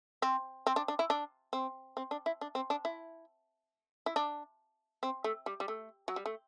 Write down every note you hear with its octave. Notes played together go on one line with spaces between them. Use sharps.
C4
C4
D4
D4
E4
D4
C4
C4
D4
E4
D4
C4
D4
E4
E4
D4
C4
A3
G3
G3
A3
F#3
G3
A3